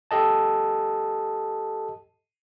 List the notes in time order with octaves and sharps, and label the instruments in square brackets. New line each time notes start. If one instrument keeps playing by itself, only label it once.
[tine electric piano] G4 A4 D#5 A5